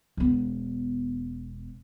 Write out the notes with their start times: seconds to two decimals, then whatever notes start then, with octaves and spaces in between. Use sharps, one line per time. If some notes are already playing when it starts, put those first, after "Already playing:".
0.17 E1 B3